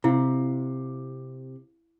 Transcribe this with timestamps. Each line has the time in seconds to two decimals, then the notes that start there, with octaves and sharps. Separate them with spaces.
0.04 C3 E4 F5